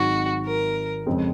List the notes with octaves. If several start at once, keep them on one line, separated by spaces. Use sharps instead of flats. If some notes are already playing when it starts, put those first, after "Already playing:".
Already playing: G#1 G#2 F#3 C4 D#4 F#4
A#4
F2 C#3 G#3 C4